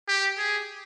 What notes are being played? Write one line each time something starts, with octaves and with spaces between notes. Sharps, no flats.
G4
G#4